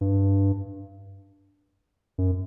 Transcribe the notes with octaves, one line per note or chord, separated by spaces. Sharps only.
G2
F#2